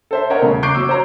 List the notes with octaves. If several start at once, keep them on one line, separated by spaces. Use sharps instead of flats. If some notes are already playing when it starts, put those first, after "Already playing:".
A4 C5 E5
A#4 C#5 D#5 F#5
D#1 C#3 A3
C#6 D6 F#6 G6 C7 D7
F#3 D6 E6
C5 C#5 A#5